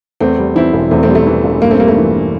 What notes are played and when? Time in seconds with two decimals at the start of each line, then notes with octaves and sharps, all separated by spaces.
0.20 E2 A3 C4
0.38 G3
0.56 E3 C4 E4
0.73 E1
0.91 E2 A3 C4
1.03 A3 C4
1.09 G3
1.15 A3
1.27 E3
1.44 E1
1.62 G2 A#3
1.71 A3 C4
1.79 G3 A#3
1.88 A3
1.97 E3